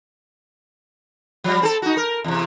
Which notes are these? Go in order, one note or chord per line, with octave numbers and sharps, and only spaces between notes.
F3 G3
C4 G#4 A4
D#4 F#4
A#4
E2 C3